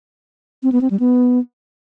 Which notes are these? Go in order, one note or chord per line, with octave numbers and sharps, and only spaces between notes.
C4
B3
C4
G3
B3